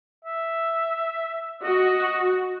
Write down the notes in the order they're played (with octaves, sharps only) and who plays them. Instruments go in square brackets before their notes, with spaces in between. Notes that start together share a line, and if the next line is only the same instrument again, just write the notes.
[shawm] E5
[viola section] F#4 [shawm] D#5